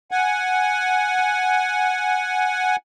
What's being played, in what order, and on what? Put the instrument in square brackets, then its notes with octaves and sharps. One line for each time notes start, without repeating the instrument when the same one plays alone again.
[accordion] F#5 G#5